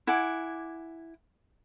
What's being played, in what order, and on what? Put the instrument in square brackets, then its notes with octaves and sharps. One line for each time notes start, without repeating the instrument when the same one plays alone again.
[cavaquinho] E4 F#5 G#5 D6